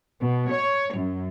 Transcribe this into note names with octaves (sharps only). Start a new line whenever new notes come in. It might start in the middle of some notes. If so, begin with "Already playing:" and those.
B2
C#5
F#2